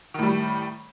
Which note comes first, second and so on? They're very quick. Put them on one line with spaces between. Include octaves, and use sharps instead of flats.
D#3 A2 G3